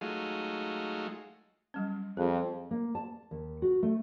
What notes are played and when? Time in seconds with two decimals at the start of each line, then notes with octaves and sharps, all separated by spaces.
0.01 F#3 G#3 A3 D#4 F4
1.74 F#3 G3 C#4
2.17 F2 G#4
2.71 A#3
2.95 A5
3.31 D#2
3.62 F#4
3.83 A3